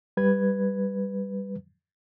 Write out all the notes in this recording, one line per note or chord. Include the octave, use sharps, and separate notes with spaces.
G3 B4 G#6